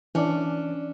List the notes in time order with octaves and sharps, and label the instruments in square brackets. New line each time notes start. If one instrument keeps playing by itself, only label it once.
[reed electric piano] E3 D5 [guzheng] C#4 D4